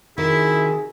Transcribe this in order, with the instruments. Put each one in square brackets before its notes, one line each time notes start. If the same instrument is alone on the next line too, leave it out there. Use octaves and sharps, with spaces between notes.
[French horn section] C3 F#4 G#4 [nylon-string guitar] D#3 [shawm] E4